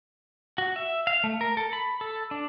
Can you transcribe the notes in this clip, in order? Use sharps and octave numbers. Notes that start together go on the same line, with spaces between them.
F#4
E5
F5
A3
A#4
A4
B5
A4
D4